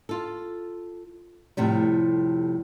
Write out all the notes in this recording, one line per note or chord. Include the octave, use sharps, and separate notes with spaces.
F4 A4
F2 A2 C3 G3